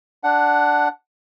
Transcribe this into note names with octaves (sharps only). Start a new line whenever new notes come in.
D4 F#5